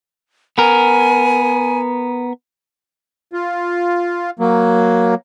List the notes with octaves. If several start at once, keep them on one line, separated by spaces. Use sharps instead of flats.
B3 A#4 G#5
F4
F#3 A#3